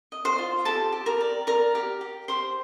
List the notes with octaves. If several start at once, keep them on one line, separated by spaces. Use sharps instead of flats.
D#5
C5 C6
F4
G4 A4 A5
G4
A#4 A#5
D5
A#4 D5 A#5
G4
G4
G4 C5 C6